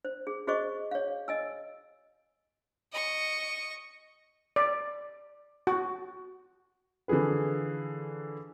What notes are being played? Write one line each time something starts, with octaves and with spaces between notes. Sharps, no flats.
C5
G#4
F#4 G#4 C5 D#5 C#6
C#5 F5
D#5 G#5 E6
D#5 C#6
D5
F#4
D3 E3 F3 G#4 B4